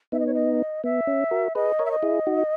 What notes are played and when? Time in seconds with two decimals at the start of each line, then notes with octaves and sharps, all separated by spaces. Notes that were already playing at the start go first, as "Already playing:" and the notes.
0.12 B3 D#4 E5
0.19 D#5
0.27 C#5
0.34 D#5
0.84 B3 E5
1.07 C#4
1.31 F#4 A#4
1.55 G#4 B4 D#5
1.79 A#4 C#5
1.86 E5
1.91 D#5
2.03 E4 G#4
2.27 D#4 F#4